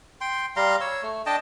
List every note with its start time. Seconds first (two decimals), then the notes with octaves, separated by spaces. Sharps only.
0.21 G5 C6
0.56 G3 F5 A#5 C6
0.81 C#5 E6
1.03 A3
1.26 D4 D#5 G5 A5